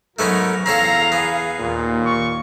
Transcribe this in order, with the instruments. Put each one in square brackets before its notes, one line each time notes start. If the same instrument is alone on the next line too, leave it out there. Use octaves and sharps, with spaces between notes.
[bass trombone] G#2 [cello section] F#3 [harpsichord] A3 B3 C#4 [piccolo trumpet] A#4
[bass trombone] E2 [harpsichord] C4 C#4 A4 [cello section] F5 [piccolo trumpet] A#5
[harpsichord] B3 [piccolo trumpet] G#4
[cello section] D#2 [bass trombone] A#2
[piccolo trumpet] C#6